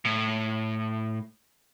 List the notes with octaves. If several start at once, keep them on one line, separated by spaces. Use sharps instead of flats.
A2